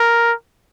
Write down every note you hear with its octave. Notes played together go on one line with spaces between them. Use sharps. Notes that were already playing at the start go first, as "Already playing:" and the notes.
Already playing: A#4